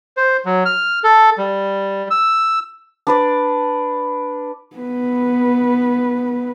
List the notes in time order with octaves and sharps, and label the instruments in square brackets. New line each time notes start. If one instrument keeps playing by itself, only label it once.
[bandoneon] C5
F#3
F6
A4
G3
E6
[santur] D4 B4 D5
[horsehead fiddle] B3 B4